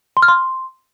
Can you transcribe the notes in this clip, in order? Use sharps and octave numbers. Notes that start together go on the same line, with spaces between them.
C6
F6
C6